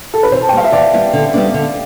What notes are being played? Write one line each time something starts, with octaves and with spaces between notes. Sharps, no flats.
A4
B4
E3 C5
A5
G5
G3 B3 E4 F5
E5
E3 D5
G3 B3 E4
D3
G3 B3 D4
D3